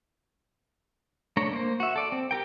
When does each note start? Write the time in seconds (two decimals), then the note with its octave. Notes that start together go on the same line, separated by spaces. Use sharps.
1.37 A3 D4 C#5 A#5
1.53 A#3 C5
1.80 F#4 E5
1.96 A4 D5
2.12 C4
2.31 G4 A#4 G5